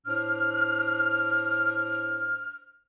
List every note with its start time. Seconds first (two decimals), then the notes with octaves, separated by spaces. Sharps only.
0.06 A2 D4 C5 F6